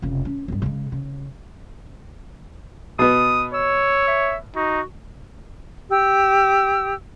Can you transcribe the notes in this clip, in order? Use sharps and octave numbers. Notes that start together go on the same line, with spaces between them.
F1 C#3
C#4
G#1 G2
C#3 G#3
C#3
B2 B3 D#6
C#5 E6
E5
D#4 F#4
G4 E6